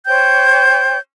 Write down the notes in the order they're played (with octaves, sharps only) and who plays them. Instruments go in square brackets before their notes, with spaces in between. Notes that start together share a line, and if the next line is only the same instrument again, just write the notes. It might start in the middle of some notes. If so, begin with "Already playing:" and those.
[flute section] C5 C#5 G5 G6